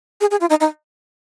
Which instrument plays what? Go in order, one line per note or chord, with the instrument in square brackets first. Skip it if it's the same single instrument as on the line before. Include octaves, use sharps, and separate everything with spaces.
[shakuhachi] G#4
G#4
F4
D#4
D#4